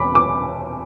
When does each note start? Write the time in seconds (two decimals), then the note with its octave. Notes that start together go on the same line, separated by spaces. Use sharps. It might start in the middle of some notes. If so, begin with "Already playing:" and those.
Already playing: E1 B5 D6
0.15 D6